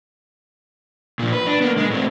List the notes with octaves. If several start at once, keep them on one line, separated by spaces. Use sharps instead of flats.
A#2 F3
B4
D4
A#3 B3
G#3
A2 C4